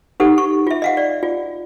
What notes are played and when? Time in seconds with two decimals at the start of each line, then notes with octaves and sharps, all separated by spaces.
0.20 D#4 G4 A4 F#5
0.38 C#6
0.67 F4 E5
0.82 D#5 F5 F#5
0.97 D5
1.23 F4